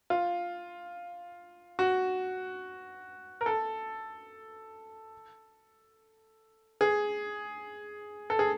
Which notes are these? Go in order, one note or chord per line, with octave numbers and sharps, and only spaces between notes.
F4
F#4
A#4
A4
G#4
A4
G#4